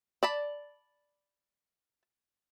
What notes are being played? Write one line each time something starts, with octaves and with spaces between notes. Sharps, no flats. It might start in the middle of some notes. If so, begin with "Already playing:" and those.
D5 A5 B5